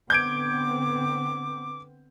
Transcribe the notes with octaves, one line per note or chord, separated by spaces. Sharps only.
D3 B3 C4 D6 G6 G#6 D7